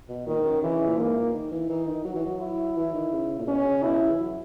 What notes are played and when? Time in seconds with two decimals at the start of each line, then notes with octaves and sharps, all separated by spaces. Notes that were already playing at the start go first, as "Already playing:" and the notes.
0.09 B2
0.27 A#2 D#3
0.38 G#2
0.45 F#2
0.63 C#3 E3
0.74 C#3
0.87 A#2
0.98 G#2 A#3
1.16 A#2
1.33 D#3
1.51 E3
1.69 E3 D#4
1.87 D#3
2.05 F#3 F#4
2.15 E3
2.26 F#3
2.40 E4
2.77 E3
2.94 D#3
3.12 C#3
3.39 A#2
3.47 B2 C#4
3.65 C#3
3.83 B2 E4
4.01 C#3
4.10 E3
4.19 F#3